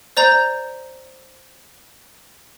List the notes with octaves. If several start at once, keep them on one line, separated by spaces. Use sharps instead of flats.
C5 D5 A#5 G6